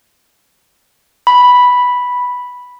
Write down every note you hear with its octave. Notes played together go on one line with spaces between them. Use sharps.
B5